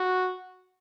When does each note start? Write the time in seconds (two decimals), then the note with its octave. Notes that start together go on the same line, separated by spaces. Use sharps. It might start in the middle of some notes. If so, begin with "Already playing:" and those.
Already playing: F#4